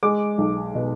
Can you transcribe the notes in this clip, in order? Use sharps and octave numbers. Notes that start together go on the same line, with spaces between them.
G#3 D6
B1
B2